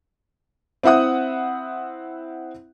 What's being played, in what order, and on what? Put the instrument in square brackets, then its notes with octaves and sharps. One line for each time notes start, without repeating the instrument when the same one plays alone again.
[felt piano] C4 E4 E5 F#5 D#6